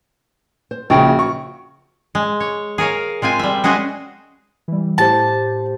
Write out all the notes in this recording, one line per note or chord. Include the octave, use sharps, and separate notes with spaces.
C5
A#1 C#3 F#4 F5 G5
C#6
G#3
C#5
G#4 A#4 C#5 F5
G#3 C4 F4 G#5
G3 E5
G#3 C#4 F#4 G#4 C5
E3 G3
A2 G4 C5 A5